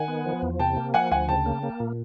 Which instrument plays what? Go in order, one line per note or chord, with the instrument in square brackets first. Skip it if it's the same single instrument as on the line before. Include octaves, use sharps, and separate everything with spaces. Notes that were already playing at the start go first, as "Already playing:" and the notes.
Already playing: [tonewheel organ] D#3 [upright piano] F#5 G#5
[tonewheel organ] B3
F3
E2
[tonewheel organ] C3 [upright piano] G5 A5
[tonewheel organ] A#3
[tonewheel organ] F3 [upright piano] F#5 G#5
[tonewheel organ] D2 [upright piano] F#5 G#5
[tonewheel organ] C#3 [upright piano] G5 A5
[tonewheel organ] A#3
A#3
A#2